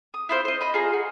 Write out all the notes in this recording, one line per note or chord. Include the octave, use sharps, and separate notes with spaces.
D#6
E4 F4 C5
C5 D#5
D#5 B5
F4 G#4 A#5
F#4